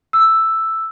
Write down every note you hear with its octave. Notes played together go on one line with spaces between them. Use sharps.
E6